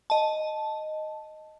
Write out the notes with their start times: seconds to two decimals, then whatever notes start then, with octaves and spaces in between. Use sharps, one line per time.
0.10 D#5 A5